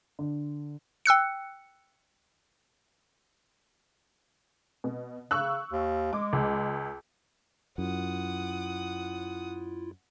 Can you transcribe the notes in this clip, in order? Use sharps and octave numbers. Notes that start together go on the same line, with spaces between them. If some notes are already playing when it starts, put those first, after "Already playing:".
D3
G5 E6 F#6 C#7
B2
C#3 C#6 E6 F#6
D#2
G#3 D6
C#2
F#2 E4 F4 F#5 D#6